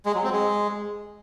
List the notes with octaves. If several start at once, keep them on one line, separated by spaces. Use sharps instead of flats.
G#3
F#3
C4
G#3